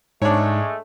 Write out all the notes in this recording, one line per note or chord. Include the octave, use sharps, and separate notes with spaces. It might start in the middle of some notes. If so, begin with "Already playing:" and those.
G#2 G#3 A3 D4 C#5